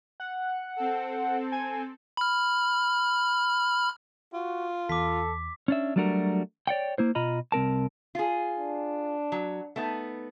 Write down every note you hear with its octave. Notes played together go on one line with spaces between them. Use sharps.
F#5
C4 A4
G#5
B5 F6
F4 F#4
E2 A4 D6 B6
C#4 D4 E5
F#3 G3 A3 D4 F#4 A#4
C#5 D5 F#5 G5
A#3 E4 C5
B2 F4 D#5 A#5 B5
C2 C4 A#4 A5
F4 G#4
D4
F#3
A3 B3 D#4